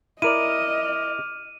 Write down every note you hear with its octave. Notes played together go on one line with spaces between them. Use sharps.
E4 A#4 D5 D#5 D6 F6 D#7